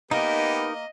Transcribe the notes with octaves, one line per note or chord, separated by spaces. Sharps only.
A#3 B3 D#4 G4 A#4 B4 D#5